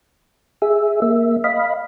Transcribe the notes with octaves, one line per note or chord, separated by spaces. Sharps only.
G#4 E5
A#3 E5
D#5 F5 B5